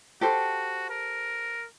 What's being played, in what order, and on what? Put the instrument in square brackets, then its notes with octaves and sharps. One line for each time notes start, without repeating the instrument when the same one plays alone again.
[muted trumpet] F#4 [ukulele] G4 A4 C5
[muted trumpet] A#4